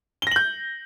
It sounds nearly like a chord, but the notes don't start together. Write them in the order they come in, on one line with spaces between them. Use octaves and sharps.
G7 A#6 F#7 G6